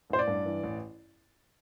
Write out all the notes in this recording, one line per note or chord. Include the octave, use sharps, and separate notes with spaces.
A1 C5
D5
G2
E3
A1